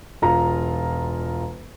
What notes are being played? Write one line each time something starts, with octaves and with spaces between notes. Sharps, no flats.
E1 F4 A#5